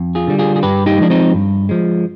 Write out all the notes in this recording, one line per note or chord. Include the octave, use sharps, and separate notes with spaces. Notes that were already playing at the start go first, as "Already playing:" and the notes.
Already playing: F2
F4 G#4
D3 G3
F4 G#4
G#4
G2 G4 B4
D#4 G4
F3 G#3 D4
C4 D#4
G2
F3 G#3